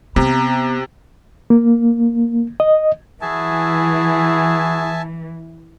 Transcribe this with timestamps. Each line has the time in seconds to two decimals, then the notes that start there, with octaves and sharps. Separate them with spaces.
0.16 C3 B3 A#5
1.50 A#3
2.60 D#5
3.21 E3 E4 F#4 G#4 E5 G#5 A5